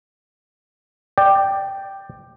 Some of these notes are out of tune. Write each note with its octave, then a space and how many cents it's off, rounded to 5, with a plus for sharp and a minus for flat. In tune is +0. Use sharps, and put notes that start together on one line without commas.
D5 +15 G5 +0